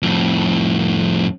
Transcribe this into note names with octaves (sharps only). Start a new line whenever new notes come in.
F2 A2